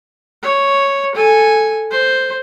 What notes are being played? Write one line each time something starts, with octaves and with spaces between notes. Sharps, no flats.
C#5
A4 G#5
C5